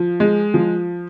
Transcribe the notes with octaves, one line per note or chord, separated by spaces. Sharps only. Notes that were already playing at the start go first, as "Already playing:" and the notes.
Already playing: F3
G#3
F3